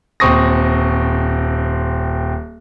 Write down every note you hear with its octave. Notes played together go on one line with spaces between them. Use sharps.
D#1 C4 C#6 D#6 A#6